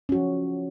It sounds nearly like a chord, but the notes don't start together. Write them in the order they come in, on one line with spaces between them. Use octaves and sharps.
C#4 F#4 F3